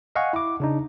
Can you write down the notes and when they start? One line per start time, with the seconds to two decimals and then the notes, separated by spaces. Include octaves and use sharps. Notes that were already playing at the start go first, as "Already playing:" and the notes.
0.16 D#5 F5 F#5 G#5 C#6
0.33 E4 D6
0.60 C#3 D4 D#4